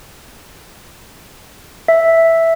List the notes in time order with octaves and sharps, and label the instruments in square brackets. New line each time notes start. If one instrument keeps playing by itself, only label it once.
[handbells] E5